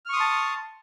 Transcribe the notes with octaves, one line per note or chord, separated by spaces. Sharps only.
A5 C6 C#6 D#6 F6